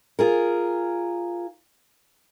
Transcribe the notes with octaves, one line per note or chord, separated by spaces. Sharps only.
F4 G#4 A#4